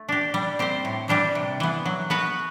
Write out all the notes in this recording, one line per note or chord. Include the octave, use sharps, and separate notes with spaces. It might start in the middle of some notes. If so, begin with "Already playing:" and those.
Already playing: A3
D4 G4
G3
C4 G4 C5
A2
E3 G3 D4 G4
C3
E3 B3
F#3
B3 F#4 B4